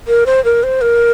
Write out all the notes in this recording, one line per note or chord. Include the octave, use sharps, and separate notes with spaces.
A#4
C5
A#4
C5
A#4